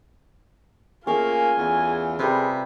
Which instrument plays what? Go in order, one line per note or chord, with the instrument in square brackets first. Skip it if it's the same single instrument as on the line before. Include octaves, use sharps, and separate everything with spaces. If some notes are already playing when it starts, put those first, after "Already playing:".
[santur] A3 C#4 G#4 [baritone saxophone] A#3 [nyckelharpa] F4 [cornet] G#5
[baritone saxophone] E2
[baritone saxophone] C3 [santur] G3 A4 B4 [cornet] G#4